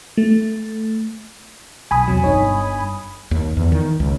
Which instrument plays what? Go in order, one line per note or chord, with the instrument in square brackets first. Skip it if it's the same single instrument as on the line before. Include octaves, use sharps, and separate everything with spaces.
[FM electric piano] A3
[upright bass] B1 [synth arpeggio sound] G#5 B5 D#6
[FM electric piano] E2 C3 F#3
[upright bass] G1 G2 [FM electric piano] D#4 C#5
[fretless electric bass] D#2
E2
D#3
C#2